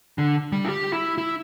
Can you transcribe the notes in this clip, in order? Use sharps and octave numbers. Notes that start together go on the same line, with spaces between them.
D3
G3
E4
G4
E4
E4